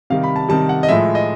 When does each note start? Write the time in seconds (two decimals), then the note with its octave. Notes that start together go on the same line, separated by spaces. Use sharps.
0.10 C3 D#3 G3 F5
0.24 B5
0.36 A5
0.49 C3 D#3 G3 A5
0.69 F#5
0.83 D#5
0.89 A2 F3 G#3 E5
1.15 D#5